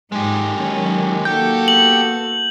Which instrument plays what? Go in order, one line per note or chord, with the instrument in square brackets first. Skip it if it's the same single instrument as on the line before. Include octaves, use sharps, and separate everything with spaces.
[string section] G#2 [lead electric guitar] G#3 G4 [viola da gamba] D#4
[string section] D#3 F#3 [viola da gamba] C#4
[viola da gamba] A#3 F#4 A4 [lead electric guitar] G4 G5 [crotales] G6
[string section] B3 [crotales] F#7